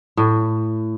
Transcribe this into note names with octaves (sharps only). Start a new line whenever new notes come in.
A2